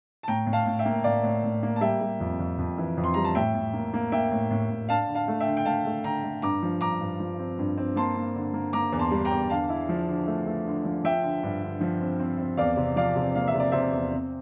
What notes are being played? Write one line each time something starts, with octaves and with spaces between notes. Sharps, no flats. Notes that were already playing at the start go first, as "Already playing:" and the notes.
A5
A2 G5 A#5
A2
F5 A5
A2
E5 G5
A#3
A2 D5 F5
A2
A2
A#3
A5
G3 E5 G5
G3
F2
F2
F2
E3
F2
C6
G3 A#5
A5
A2 E5 G5
A2
A#3
A#3
A#3 E5 G5
A2
A2
A2
D4 F5 A5
D3
F5 A5
A3
E5 G5
D3
G5
A3 F5 A5
A3
D3 G5 A#5
A3
G2 A#5 D6
F3
G2 A#5 D6
G2
F3
C4
G2
C4
A#3 A5 C6
A#3
D3
A#3
A#3 A#5 D6
E2
A5 C6
G3
G5 A#5
E2
D3 F5 A5
E4
F3
D3
A3
A3
D3
F3
F3 E5 G5
D3
G2
D3
F3
C4
C4
C4
E2 D5 F5
C3
F3 D5 F5
C3
A#3 F5
E5
C3
D5
C3 C5 E5
E2
C4